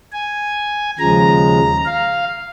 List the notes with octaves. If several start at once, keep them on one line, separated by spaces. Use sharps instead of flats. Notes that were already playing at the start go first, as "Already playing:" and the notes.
G#5
D#2 C#3 F3 G#3 A#5
F5